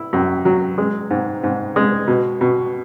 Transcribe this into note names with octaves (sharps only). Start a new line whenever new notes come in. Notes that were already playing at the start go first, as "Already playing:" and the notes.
Already playing: E4
F#2
F#3
G#3
G#2
G#2
G#3
B2
B2